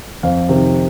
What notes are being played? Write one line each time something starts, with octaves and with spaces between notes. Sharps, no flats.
F2 F5
C3 D#3